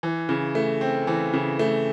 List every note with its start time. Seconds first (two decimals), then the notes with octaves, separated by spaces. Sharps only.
0.03 E3
0.29 C#3
0.55 A3
0.81 C4
1.07 E3
1.34 C#3
1.59 A3